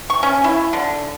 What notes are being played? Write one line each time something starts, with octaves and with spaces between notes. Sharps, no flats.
C#6
C#4
E4
D3